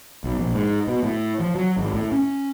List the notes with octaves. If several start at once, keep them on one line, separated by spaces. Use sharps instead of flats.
B1
A#1
G#2
B2
A2
F3
F#3
G#1
A2
C#4